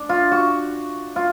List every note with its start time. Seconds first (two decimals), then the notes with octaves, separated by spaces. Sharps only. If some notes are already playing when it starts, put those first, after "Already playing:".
Already playing: D4
0.09 F4
0.31 F#4
1.16 F4